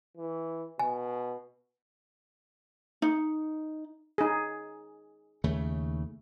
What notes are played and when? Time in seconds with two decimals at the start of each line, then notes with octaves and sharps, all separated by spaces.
0.17 E3
0.79 B2 G#5
3.02 D#4
4.18 D#4 G#4
5.44 D#2 C#3 A3